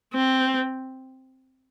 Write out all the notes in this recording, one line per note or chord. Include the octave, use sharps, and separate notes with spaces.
C4